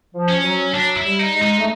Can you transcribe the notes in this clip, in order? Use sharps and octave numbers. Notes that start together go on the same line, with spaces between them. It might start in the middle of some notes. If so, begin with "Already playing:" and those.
F3
C#4
F#3
F#3 D4
E4
G3
D#4
G#3
D#4
A3